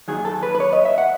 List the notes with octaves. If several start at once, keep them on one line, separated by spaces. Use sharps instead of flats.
D#2 D#3 F#3 G#4
A4
B4
B4
C#5
D#5
E5
F#5